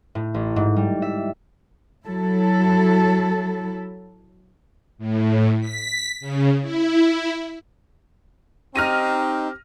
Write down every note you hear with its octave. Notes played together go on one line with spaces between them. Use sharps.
A2
A1
G#2
G3
E5
F#3 E4 A4
A2
B6
C#3
E4
C4 D#4 G4 F6 A#6 D#7